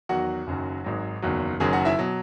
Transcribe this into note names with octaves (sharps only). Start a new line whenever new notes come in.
E2 D#3 F#3 F#4 F#5
F#1 F#2 D#3 F#3
G#1 G#2 D#3 F#3
F#1 E2 D#3 F#3
F#1 F#2 D#3 F#3 G#4 G#5
F#4 F#5
E4 E5
B2 F#3